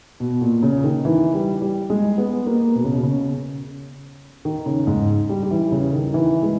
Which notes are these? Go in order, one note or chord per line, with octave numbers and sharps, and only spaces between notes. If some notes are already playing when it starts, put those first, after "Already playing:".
B2
A#2
C#3
D#3
E3
G3
G3
G#3
B3
A#3
B2
C#3
B2
C#3
D#3
C#3
G#2
G3
G3
E3
C#3
D#3
E3
G#3